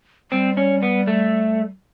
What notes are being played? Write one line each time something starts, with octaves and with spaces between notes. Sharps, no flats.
G3 C4
C#4
B3
A3